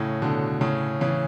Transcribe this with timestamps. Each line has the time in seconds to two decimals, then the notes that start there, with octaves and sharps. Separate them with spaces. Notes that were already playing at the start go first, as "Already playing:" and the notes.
Already playing: A2 C#3
0.22 B2 D3
0.61 A2 C#3
1.01 C#3 E3